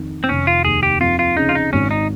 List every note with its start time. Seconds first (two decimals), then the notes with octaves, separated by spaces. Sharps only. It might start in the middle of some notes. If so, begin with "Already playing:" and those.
Already playing: F2 D#3
0.24 C4
0.29 F1 C#4
0.47 F4
0.65 D#2 G#4
0.83 G4
1.00 F2 F4
1.19 F4
1.37 C#3 D#4
1.49 F4
1.55 D#4
1.73 G#1 C#4
1.91 D#4